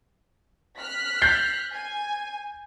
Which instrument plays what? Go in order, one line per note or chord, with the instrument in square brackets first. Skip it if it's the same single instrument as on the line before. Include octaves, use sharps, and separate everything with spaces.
[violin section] F6 F#6 B6
[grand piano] G6 A6 C7
[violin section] G#5